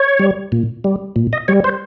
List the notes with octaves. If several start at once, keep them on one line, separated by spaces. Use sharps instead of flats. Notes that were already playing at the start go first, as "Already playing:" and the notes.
Already playing: C#5
G3
A#2
G3
A#2
D#5
G3 C#5
C5